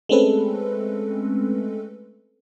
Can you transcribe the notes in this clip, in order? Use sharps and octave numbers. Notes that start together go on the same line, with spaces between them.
G#3 A3 C4 C#4 A4 B4